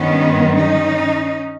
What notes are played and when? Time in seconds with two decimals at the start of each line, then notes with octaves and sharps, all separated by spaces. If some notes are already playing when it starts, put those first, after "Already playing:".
Already playing: G2 D#3 B3 C#4
0.54 C#4 D#4